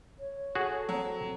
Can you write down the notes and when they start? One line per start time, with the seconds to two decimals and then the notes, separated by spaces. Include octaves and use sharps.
0.19 C#5
0.55 F#4 G#4 A4
0.89 F#3 C4